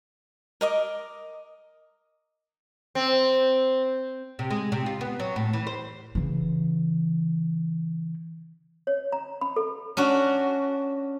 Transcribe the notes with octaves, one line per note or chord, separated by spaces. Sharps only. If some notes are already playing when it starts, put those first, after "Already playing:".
A#4 D#5 D6
C4
C3
G#3
C3
F4
B3
F#3
A2
E3
C5
C#3 E3
C#5
A#5
B5
A4
C#4 D4 F#4